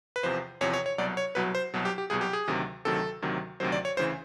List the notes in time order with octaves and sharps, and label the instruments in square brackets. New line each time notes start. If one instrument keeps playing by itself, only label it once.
[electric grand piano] B4
E2 C3 F3 C5
E2 C3 F3 C#5
C#5
C#5
C2 B2 F#3 D5
C#5
C2 B2 F#3 B4
C5
C2 B2 F#3
G4
G4
C2 B2 F#3 G#4
G4
G#4
D2 C3 D#3 F#3
D2 C3 D#3 F#3 A4
D2 C3 D#3 F#3
D2 C3 D#3 F#3 C5
D5
C#5
D2 C#3 E3 C5